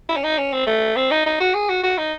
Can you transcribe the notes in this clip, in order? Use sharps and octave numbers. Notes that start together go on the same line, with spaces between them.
E4
C#4
D#4
C#4
C4
A3
C4
D#4
D#4
F#4
G#4
F#4
F#4
D#4